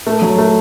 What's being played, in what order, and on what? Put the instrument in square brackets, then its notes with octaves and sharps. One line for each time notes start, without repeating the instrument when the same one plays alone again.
[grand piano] A3
F#3
A3